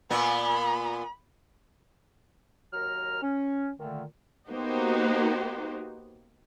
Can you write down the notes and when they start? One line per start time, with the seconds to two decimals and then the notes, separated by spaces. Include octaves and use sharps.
0.10 A#2 B3 B5
2.73 D#2 F#3 A#4 A#5 F6
3.22 C#4
3.79 A#2 D3 D#3 A3
4.50 A#3 B3 D#4 F#4 G4 C5